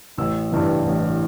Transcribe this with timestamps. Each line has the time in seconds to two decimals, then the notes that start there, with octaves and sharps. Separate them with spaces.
0.18 A1 E6
0.52 G2 E3
0.85 A1